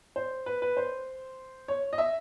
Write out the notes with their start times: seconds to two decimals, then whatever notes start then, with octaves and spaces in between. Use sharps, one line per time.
0.16 C5
0.46 B4
0.62 B4
0.77 C5
1.68 C#5
1.93 D#5
1.98 E5